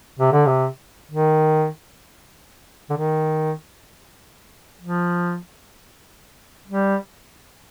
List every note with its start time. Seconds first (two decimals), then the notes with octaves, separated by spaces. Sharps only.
0.19 C3
0.32 D3
0.46 C3
1.11 D#3
2.90 D3
2.96 D#3
4.82 F3
6.68 G3